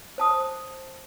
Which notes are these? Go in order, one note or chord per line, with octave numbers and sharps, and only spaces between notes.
C5 A5 D#6